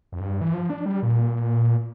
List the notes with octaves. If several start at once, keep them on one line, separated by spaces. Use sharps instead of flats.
F2
G2
E3
F3
D4
G3
A#2